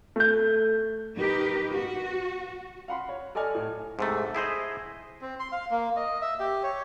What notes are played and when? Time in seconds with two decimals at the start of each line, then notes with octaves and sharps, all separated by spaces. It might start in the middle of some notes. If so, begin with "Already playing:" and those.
0.16 A3 G6
1.16 D#4 G4 A#4 B4
1.72 F#4
2.88 F5 F#5 B5 C6
3.09 C#5
3.35 A4 D5 D#5 G#5 F6
3.55 A2
3.99 G#2 C3 A3
4.35 E4 G#4 C5 D#5
5.21 C4
5.40 C6
5.52 F5
5.71 A#3
5.97 D#5
6.21 E5
6.40 G4
6.63 C#5